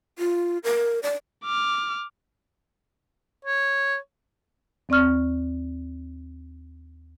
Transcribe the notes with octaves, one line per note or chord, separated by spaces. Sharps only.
F4
A#4
D5
D6 F6
C#5
D#2 C4 D5 C#6 F6